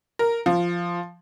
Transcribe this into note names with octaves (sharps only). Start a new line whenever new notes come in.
A#4
F3